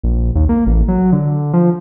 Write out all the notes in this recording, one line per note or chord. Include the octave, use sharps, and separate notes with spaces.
A#1
D#2
A#3
A1
F#3
D3
F3